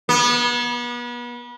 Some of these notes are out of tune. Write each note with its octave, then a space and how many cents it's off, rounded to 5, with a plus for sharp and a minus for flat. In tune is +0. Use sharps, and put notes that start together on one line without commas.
B3 -35